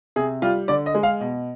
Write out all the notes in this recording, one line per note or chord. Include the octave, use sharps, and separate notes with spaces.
C3 G#4
G3 F4
D3 D5
D#5
G#3
F5
B2